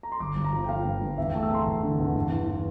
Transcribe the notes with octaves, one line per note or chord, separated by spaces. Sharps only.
A#5
C6
G1 D6
G1
A#5
F3
G5
F3 F5
G2
G2
E2 E5
G5
A3
E6
E2 A#5 C6
F1
D3
E2
G2
E3
E3